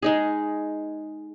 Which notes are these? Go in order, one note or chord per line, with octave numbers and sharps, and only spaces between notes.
G#3 D#4 G#4